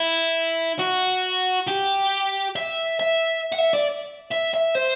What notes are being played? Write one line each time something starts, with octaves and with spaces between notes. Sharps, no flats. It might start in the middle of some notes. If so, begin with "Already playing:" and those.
Already playing: E4
F#4
G4
E5
E5
F#5
E5
D5
E5
E5
C5